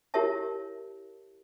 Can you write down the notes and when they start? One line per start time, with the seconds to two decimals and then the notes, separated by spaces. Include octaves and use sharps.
0.14 E4 G4 A#4 C#5 E5 A5